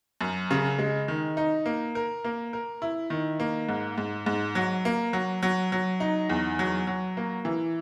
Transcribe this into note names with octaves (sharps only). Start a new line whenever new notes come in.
F#2
C#3
G#3
D#3
D#4
A#3
A#4
A#3
A#4
E4
D#3
A#3
G#2
G#2
G#2
F#3
A#3
F#3
F#3
F#3
D#4
E2
F#3
F#3
A#3
E3